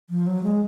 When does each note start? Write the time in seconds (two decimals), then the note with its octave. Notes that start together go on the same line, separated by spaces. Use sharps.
0.10 F3
0.27 F#3
0.43 G#3